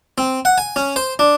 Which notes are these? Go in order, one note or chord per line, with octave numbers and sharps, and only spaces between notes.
C4
F#5
G#5
C#4
C5
D4